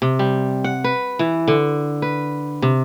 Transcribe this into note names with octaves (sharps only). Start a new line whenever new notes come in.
C3
G3
F#5
B4
E3
D3
B4
C3